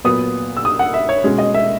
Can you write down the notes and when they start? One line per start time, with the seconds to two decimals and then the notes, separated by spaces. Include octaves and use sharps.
0.04 A#2 F#3 B3 D#6
0.57 E6
0.65 D#6
0.79 F#5
0.94 E5
1.09 C#5
1.24 B2 G#3 C#4
1.38 D#5
1.54 E5